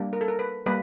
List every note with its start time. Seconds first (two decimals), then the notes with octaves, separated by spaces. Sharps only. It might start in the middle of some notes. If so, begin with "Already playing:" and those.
Already playing: G3 A#3 D4
0.13 A#4
0.21 A4
0.28 A#4
0.39 B4
0.66 G3 A#3 B4